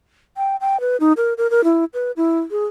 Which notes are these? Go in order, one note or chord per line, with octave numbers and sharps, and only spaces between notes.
G5
G5
B4
D#4
A#4
A#4
A#4
E4
B4
E4
G#4